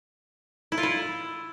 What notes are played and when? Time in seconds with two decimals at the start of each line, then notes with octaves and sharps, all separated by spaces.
0.72 E4
0.78 F4
0.83 E4